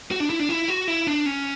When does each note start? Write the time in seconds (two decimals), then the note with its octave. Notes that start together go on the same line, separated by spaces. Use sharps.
0.11 F#4
0.20 D4
0.30 E4
0.39 D4
0.49 E4
0.68 F#4
0.88 E4
1.07 D4
1.26 C#4